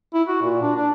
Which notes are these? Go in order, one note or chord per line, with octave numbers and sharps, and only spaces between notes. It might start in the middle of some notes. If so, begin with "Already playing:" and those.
E4
F#4
A#2
D4
D4